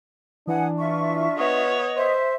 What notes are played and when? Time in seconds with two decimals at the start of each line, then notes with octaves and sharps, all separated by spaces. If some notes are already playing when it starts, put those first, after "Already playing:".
0.47 E3 D4 F#5 G#5 D#6
0.78 F4 E5 C#6
1.37 B3 C#5 D#5
1.97 C5 E5